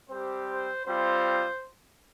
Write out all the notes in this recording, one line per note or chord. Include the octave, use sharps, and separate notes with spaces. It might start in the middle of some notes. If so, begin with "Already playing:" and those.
G3 C4 G4 C5
C5
G3 C4 F4 C5